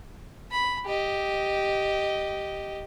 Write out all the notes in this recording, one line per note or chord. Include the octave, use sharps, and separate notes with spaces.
B5
G4 D#5